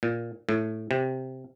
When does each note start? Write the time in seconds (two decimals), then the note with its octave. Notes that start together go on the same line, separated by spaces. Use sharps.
0.03 A#2
0.49 A2
0.91 C3